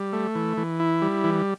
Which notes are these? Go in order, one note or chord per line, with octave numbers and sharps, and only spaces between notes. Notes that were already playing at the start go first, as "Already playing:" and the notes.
Already playing: G3
A3
E3
E3
E4
G3
E3